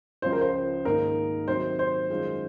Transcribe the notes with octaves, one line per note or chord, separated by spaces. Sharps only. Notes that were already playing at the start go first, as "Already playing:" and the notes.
C#2 C#3 F3 C5
A#4
C5
G#2 D#3 A#3 D#4 A#4
C3 D#3 F#3 C5
C5
F#2 D#3 G#3 C#4 F4